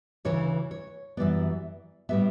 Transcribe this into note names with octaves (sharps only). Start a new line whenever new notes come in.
D2 C#3 E3 C#5
C#5
F#2 E3 G3 B3 D5
A2 G3 B3 E5